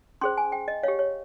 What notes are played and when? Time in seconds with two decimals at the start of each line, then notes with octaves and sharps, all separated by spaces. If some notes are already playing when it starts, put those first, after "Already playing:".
0.21 C#4 G#4 C5 C6
0.37 G#5
0.52 G5
0.68 D#5
0.83 G4 C#5 F5
0.99 C#5